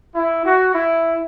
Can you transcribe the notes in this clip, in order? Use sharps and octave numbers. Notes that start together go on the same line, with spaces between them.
E4
F#4
E4